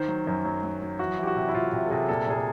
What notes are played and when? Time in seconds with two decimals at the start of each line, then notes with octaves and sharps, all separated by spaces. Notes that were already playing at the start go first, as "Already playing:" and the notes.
Already playing: D#3 C5
0.08 F#3
0.27 F#2
0.45 F#3
0.64 F#3
0.82 F#3
0.99 E3 F#4
1.18 E3 G4
1.27 F#4
1.36 C3
1.49 E4
1.54 C3 F4
1.73 C3
1.86 A4
1.90 C3 G#4
2.09 A#2 A4
2.27 A#2 G#4
2.37 A4